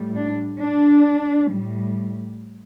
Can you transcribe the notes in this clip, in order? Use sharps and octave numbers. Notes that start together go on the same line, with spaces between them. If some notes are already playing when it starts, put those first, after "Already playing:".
Already playing: A2 G3
D4
D4
A2 G3